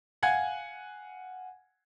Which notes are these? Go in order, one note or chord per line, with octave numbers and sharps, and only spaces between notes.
F5 F#5 G#5 G#6